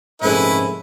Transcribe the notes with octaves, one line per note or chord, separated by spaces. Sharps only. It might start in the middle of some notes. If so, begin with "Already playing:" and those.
A#1 G#2 C3 G#3 A3 C#4 E4 B4